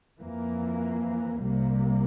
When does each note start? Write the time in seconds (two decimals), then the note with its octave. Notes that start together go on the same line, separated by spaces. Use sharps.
0.20 F2 E3 A#3
1.41 C2 C3 G3 A#3